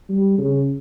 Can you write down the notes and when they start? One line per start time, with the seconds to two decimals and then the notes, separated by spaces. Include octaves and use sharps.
0.09 G3
0.38 C#3